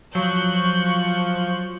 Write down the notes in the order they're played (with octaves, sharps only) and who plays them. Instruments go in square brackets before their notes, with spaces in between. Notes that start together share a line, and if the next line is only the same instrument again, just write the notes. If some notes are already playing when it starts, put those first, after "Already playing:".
[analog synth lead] F3 [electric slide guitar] F#3 [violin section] C#6 F#6 G6